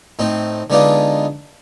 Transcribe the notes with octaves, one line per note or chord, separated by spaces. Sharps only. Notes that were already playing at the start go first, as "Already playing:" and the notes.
A2 C4 D#4
D3 G#3 B3 D4 D#4 F4